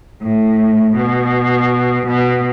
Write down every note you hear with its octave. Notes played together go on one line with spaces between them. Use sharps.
A2
B2
B2